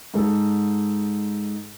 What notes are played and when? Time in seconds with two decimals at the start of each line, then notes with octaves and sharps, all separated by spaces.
0.14 G#2 A4